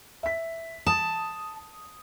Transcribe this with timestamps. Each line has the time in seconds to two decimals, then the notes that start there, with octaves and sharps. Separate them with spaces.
0.23 E5 B6
0.87 A5 D#6